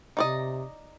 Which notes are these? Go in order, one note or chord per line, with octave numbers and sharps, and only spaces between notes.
C3 D#4 D5 D#5